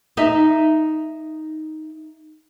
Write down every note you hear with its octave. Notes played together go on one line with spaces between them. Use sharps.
D#4 E5